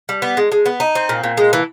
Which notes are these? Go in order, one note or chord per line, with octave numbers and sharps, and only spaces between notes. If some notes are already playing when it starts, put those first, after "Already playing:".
G3
B3
G#3
G#3
B3
D#4
C4
A#2
A#2
G#3
E3